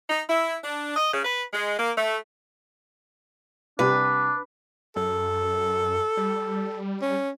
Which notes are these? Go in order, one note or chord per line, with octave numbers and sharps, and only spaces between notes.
D#4
E4
D4
D#5
C#3
B4
G#3
A#3
A3
C2 G3 D4 B4
F#2 A4
G3
C#4